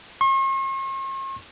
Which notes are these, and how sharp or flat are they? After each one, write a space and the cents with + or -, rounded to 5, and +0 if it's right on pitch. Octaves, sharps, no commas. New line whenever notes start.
C#6 -45